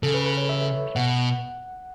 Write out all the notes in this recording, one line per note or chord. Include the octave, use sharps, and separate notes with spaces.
C#3 A4
B4
B4
C#5
E5
B2 F#5